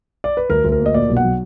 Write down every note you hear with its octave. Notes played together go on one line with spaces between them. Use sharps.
D5
B4
D2 A#4
D2
A#4
A#3
D#5
A#2 D5
B1
F#5
F#3